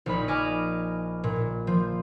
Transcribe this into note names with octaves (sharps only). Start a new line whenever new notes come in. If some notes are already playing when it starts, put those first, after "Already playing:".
A#1 D#4 B5
D#5 G#5 D6 D#6 F6
A#2
F3